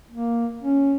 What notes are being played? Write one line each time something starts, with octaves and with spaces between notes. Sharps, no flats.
A#3
C#4